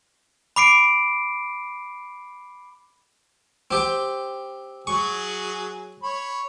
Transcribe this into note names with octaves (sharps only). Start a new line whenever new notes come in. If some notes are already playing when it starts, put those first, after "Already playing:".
B5 D6 C7 D7
C4 G4 G5
F#3 G#4 C#6
C#5 B5